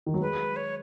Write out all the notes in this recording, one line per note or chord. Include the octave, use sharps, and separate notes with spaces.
D#3
F#3
G#3 B4
C#5